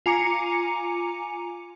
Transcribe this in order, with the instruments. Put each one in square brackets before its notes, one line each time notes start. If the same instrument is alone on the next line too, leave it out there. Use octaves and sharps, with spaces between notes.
[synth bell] F4 G#5 A#5 D6 C#7